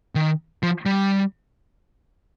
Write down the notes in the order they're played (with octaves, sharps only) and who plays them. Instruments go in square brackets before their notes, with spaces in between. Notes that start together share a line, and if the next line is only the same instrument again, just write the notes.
[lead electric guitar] D#3
F3
G3